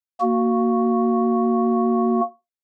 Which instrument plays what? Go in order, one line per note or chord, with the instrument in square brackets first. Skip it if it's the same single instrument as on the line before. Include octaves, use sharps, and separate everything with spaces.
[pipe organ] A#3 F#4